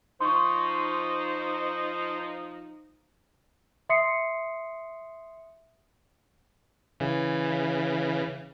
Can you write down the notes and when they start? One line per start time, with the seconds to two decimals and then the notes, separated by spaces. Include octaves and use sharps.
0.21 F3 D#4 C5 C6 C#6
3.89 E5 C6 D#6 C7 C#7
7.00 C#3 E3